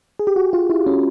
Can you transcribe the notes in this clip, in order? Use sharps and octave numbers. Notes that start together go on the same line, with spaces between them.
G#4
G4
F#4
F4
E4
C#4